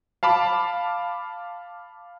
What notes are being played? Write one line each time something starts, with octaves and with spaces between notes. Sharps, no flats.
F5 A5 B5 D6